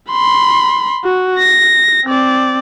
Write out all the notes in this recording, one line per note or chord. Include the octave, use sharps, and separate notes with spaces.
B5 C6
F#4
A#6
C4 D5